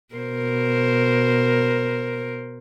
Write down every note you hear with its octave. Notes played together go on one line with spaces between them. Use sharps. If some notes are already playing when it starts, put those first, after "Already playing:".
B2 A#4 C5